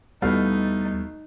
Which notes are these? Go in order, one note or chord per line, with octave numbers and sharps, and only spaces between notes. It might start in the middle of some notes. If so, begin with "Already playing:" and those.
D#2 B2 G3 A3 D#4 E4 F5 A6